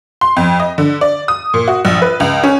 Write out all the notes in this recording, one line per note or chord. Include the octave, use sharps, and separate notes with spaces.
C6
F2
D#5
D3
D5
D#6
A#2
F#4
A#1
B4
C#2
C#4